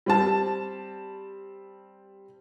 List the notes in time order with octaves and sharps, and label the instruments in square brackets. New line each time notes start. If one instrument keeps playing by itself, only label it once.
[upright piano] G3 C4 A5